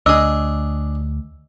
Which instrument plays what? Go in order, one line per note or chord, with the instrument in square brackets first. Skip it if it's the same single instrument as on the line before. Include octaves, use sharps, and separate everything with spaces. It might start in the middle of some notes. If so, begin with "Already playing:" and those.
[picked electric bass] D2 [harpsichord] D4 G#4 [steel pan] D#5 [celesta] E6